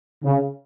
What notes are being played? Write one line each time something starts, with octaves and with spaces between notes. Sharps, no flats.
C#3